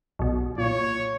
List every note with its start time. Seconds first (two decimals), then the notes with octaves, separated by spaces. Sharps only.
0.19 B1 B2
0.58 A#2 C#5